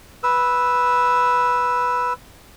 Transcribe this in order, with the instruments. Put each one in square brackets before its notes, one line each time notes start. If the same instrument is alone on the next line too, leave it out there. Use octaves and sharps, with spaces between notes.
[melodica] B4 E6